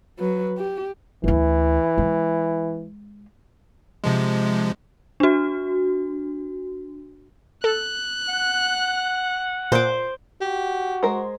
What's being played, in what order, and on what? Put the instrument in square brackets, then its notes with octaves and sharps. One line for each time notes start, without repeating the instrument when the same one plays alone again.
[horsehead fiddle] F#3 B4
G4
[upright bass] D2 E4 [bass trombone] E3
[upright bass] G#3
[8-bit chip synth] C3 F3 G#3
[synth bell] D4 F#4
[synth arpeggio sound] A4 [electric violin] F#6
[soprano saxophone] F#5
[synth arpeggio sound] A#2 [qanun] C5 D6
[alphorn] F#4 [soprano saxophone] G4
[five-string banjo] G#3 A#4 C5